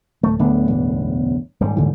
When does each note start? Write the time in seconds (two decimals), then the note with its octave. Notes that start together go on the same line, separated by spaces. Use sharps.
0.23 D1 A3
0.39 D1 D2 A3 B3 D4
0.68 E1 A1 E2
1.60 D#1 G#2 G3
1.77 D#2 D3 E3